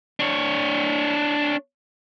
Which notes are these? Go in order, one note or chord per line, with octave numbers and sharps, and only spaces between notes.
D4 C#5